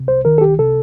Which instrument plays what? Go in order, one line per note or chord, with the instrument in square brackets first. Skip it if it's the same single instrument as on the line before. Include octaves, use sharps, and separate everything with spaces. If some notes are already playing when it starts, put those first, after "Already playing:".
Already playing: [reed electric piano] C3
C2 C5
D#3 A#4
A4
C2 G4
C3 A4